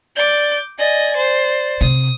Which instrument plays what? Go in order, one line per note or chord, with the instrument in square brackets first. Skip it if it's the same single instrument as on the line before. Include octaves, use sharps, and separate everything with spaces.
[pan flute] D5 [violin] D6 G6
[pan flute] D5 [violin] D#5 G#5
[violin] C5
[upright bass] C3 [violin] D#6